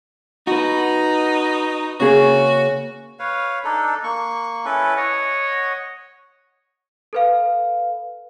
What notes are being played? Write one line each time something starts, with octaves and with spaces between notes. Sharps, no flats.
D#4 F#4 B4
C#3 A#3 F#4 G#4
B4 C#5 F5
D4 D#4 A4
A#3 C#6
C#4 E4 A4 B4
C#5 D#5 F#5
A4 B4 F5